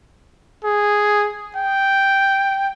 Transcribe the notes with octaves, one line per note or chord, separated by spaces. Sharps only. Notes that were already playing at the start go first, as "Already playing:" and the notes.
G#4
G5